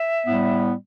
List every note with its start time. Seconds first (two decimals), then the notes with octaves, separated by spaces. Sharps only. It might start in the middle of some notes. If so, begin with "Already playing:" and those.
Already playing: E5
0.26 A2 G3 B3